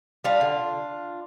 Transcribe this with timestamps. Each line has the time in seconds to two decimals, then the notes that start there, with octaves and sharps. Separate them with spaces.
0.24 G3 D4 F4
0.41 D3